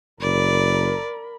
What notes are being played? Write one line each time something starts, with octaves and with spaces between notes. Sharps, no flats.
F#1 A#4 D5 B5